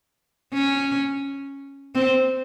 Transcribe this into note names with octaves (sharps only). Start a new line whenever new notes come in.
C#4
C4